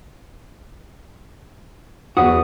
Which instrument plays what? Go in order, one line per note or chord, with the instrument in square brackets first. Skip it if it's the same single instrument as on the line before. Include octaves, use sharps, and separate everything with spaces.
[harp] E2 B3 D#6 [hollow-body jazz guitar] F#4